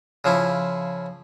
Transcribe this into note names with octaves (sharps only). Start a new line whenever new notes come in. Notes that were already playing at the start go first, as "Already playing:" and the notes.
C#3 F3 E4